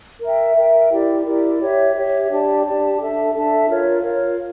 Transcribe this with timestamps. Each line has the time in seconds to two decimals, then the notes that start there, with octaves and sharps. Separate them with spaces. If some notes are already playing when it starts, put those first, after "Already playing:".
0.21 A#4 E5 G5
0.57 A#4 E5 G5
0.90 E4 G4 A#4 D5
1.26 E4 G4 A#4 D5
1.60 G4 C#5 E5
1.95 G4 C#5 E5
2.30 D4 G4 D5 A5
2.65 D4 G4 D5 A5
2.99 D4 A4 E5 A5
3.33 D4 A4 E5 A5
3.68 F4 A#4 C#5 F5
4.03 F4 A#4 C#5 F5